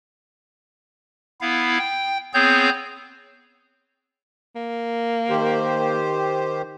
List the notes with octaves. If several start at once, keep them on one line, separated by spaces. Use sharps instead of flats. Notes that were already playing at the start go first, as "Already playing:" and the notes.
B3 E4 F5
G5
B3 C4 G#4 C#5 G6
A#3
D#3 G4 C5